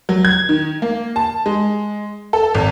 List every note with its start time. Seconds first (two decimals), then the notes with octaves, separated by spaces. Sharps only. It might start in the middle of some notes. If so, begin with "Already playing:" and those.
0.09 F#3
0.25 G#6
0.49 D#3
0.82 A#3
1.16 A5
1.46 G#3
2.33 A4
2.55 G#1